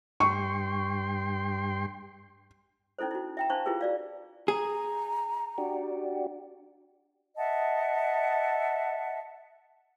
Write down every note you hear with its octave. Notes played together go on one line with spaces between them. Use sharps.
G2 G5 C6 C#6
C#4 D#4 E4 A4 C5
E4 F#4
E5 G5 A#5
D4 C5 F5 A5 C#6
E4 F4 G4 G#4 B4
F#4 D5 F5
G#4 A#5
D4 F#4 G4
D#5 E5 F#5 A5